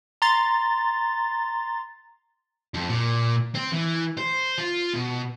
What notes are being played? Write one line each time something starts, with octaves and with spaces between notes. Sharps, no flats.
A#5 C6 A6
F2
A#2
C4
E3
C5
F4
B2